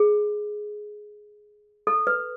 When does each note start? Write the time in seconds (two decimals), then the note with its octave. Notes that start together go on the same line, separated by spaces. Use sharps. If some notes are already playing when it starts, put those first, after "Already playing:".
Already playing: G#4
1.87 A4
2.07 B4